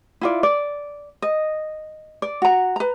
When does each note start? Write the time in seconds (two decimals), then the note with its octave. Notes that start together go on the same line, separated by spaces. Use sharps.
0.21 E4 F4 D5
0.43 D5
1.22 D#5
2.22 D5
2.42 F#4 A#5
2.76 B4 A#5